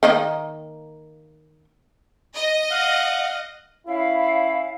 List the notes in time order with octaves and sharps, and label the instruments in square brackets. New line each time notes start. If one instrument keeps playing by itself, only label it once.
[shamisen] D#3 A#3 D#5
[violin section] D#5
[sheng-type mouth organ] F5 F#5
[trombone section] C#4 E4 [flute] F5